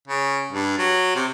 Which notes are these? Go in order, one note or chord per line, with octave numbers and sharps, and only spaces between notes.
C#3
G2
F#3
C3